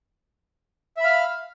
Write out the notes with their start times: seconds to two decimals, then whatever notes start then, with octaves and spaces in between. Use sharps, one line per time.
0.97 E5
1.00 B5
1.04 F5